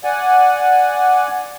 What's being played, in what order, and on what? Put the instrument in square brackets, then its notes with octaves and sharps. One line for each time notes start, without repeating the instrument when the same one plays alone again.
[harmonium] D5 F#5 G#5